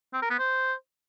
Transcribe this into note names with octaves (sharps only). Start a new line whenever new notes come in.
C4
A#4
B3
C5